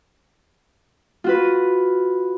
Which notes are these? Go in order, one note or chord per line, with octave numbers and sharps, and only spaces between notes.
F4 F#4 B4